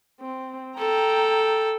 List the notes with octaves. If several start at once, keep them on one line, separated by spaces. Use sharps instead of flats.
C4
A4 G5 A#5